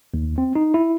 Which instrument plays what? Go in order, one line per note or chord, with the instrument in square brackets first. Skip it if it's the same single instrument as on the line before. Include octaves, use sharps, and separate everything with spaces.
[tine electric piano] D#2
C4
D#4
E4